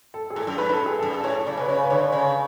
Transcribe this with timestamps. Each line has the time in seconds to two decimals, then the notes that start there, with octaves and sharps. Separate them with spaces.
0.14 A4
0.30 G#4
0.36 A2 A4
0.47 F#2
0.58 G#2 B4
0.69 F#2 A4
0.86 G#4
0.99 F#2 A4
1.24 A2 C#5
1.47 C#3 D5
1.58 B2 B4
1.68 C#3 C#5
1.84 B4
1.90 D3 C#5
2.12 C#3 C#5